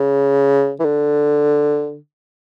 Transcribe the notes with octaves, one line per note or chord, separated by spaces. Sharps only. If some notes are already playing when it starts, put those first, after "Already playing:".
Already playing: C#3
E3
D3